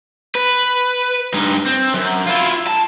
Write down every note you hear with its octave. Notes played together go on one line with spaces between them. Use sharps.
B4
G2 D#4
C4
F#2
E4 F4
A5